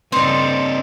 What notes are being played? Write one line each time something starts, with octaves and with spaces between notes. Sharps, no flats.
G2 C#3 C4 D4 D#4 A4 C5